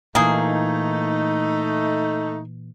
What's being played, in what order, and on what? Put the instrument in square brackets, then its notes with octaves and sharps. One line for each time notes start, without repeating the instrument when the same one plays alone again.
[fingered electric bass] A#2 E3 [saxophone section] A3 D#4 [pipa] A#3 G#4